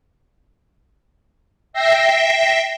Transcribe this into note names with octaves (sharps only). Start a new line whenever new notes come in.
E5 G5 A#6 C7